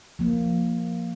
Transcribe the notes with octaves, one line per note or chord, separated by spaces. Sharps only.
F3 A#3